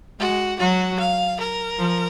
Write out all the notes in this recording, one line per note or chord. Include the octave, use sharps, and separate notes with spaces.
G#3 F#4
F#3 F#4
F5
A#4
F3